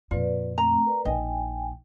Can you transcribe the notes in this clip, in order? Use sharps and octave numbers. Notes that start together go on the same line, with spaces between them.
F2 A#2 F4 B4 D5
A3 C4 A#5
A#4 B4 D5
A#1 D#4 D#5 G5 G#5